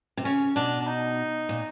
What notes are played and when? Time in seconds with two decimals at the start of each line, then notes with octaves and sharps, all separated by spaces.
0.17 C3
0.24 C#3 C#4
0.56 B2 D4
0.81 D4
0.87 D#4
1.49 A#2